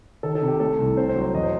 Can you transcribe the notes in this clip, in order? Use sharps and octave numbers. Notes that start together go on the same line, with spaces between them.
D#3 A4
A4
C3
G4
A3 A4
C2
C4 C5
C5
F#3
C5
E2 D#5
C5